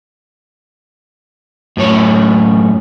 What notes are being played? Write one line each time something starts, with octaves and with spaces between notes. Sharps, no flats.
F#2 A2 C#5